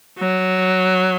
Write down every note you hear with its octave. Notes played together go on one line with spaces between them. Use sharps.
F#3